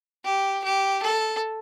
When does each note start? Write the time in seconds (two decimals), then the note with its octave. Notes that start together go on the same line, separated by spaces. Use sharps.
0.25 G4
0.64 G4
1.03 A4